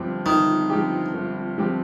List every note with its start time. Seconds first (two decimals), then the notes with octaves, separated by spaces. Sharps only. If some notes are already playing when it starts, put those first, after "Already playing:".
Already playing: G1 G2 F3 C4 G4
0.25 G1 D#3
0.70 G2 F3 C4 G4
1.14 G1
1.58 G2 F3 C4 G4